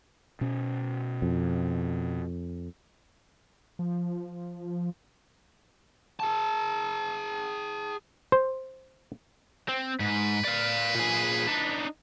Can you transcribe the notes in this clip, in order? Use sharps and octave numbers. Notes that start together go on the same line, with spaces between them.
B2 C#4
F2
F3
G#4 A5
C5
C4
G#2 B4
D5 F5
A#2 G#4
D4 D#4